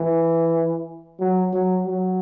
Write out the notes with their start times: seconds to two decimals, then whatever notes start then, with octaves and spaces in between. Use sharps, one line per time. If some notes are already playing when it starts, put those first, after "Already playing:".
Already playing: E3
1.20 F#3
1.53 F#3
1.86 F#3